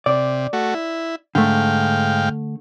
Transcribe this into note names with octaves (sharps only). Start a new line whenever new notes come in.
C3 D5
A3 F#4
E4
G#2 D3 A3 F5 G5